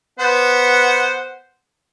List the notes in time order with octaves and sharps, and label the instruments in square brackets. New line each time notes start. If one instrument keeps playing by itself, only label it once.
[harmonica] B3 C5 F#5